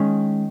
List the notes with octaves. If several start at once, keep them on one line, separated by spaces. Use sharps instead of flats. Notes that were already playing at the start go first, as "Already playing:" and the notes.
Already playing: D#3 G#3 C#4